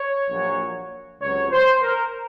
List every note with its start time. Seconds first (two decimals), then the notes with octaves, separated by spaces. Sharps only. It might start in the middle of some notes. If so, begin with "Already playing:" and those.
Already playing: C#5
0.29 A#1 A#2 F#3
1.20 C#2 C3 F#3 C#5
1.52 C5
1.82 A#4